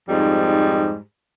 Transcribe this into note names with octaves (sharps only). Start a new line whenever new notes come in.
F2 G#2 G3 D#4